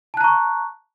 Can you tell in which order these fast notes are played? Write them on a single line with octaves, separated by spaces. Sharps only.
A5 F#6 A#5 C#6